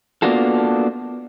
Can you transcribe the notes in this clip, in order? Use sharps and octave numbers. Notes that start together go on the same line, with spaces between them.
A#3 B3 D4 F4 F#4 A4